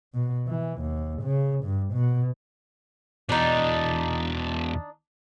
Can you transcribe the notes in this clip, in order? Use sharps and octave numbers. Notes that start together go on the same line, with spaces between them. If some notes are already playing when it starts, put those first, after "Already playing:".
B2
E3
D#2
C#3
G2
B2
E2 B2 D4 D#4